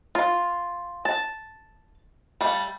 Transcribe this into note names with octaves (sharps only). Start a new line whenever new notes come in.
F4
A5
G3 A3 F5